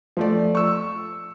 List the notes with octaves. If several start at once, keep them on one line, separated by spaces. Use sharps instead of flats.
F3 A3 D5
C#6 E6